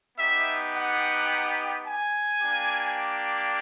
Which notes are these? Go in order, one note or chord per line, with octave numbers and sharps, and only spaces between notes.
B3 D#4 G4 E5
F#5
G#5
A#3 D4 G4